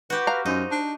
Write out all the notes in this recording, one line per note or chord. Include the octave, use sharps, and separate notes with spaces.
F#4 G4 B4
F5 A#5
F#2 D#4 C5
D4